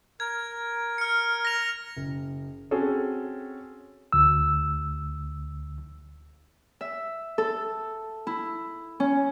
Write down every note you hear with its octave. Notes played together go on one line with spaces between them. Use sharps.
A#4 G#6
F6 C#7
A#6 F7
F#1
C4 C#4 F#4 G#4 A4 C#5
D2 E6
E5
A4
E4
C#4